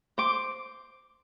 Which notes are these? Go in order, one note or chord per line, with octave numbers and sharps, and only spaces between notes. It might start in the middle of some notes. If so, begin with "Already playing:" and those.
C5 D6